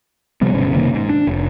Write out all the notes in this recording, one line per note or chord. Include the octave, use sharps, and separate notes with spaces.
C3 F3 G3 B3
G1 B2 C#4
F#1 C3 D#3 A#3
G#2
D4
F1